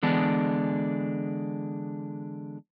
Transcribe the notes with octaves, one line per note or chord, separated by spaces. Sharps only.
D3 E3 G#3 B3 D4